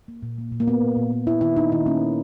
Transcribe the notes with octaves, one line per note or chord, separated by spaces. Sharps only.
A#3
A#2
A#3
A#2
A#3
A#2 B3
A#2
A#2
A#3
A#3 E4
D#3 E4
A#3 D#4
D#3 E4
A#3 C#4
D#3